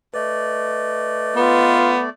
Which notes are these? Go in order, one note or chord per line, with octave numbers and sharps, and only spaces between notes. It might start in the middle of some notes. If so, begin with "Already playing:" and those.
A3 B4 D5 D#5
B3 F4